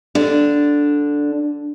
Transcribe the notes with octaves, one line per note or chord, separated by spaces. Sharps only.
D3 D4